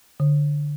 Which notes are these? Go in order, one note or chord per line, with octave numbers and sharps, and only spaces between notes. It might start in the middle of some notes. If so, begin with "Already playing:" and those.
D3